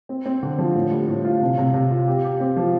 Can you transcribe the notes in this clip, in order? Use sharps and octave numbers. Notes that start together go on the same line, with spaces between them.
C4
C4
D3
F3
A2
G3
A2
F4
C3
C3
C3
F4
G4
G4
C4
F3